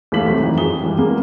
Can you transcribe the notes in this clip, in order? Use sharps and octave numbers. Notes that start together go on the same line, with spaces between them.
D#2 E3 A3 F5 B6 F#7
C3 F#3 G3 A3 C4
F#2 D#3 E3
F2 F4 G#4 D#6 G7
G2 E3 G3
E2 G3 G#3 A#3 B3